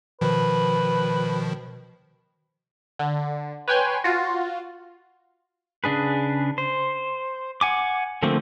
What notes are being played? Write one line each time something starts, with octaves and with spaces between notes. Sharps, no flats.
B2 D#3 F3 B4
D3
B4 C#5 G5 G#5 C6 F#6
F4 F#4
C#3 D4 G#4 B4
C5
F#5 G#5 D6
D3 F3 A3 A#3 C4